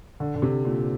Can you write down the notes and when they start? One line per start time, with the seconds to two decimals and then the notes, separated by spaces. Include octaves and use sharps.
0.20 D3
0.36 D3
0.42 C3
0.65 A#2